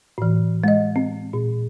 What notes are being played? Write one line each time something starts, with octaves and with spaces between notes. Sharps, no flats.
A2 E3
G#3 D#5
C4
A#2